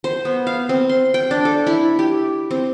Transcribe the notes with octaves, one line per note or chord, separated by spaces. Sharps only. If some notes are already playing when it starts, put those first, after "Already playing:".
C5
B3
F5
C4
C6
G5
D4
A4
E4
G4
C4